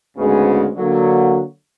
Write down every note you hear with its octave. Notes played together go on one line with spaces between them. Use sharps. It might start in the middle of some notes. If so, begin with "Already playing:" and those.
D2 G#2 C#3 G#3 B3 C#4
D3 F#3 A#3